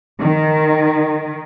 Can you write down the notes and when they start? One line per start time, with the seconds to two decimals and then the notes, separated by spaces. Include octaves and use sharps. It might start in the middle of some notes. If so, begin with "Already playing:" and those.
0.20 D#3